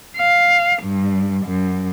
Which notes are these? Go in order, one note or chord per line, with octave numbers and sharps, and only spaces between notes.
F5
G2
F#2